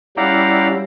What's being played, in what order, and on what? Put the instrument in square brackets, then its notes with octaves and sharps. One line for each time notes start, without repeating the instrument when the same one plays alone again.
[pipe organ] G3 C#4 [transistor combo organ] E4 G4 D5 [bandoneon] F5 F#5 A#5